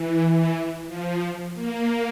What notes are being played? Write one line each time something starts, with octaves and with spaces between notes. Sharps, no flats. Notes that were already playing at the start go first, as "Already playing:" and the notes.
Already playing: E3
F3
A#3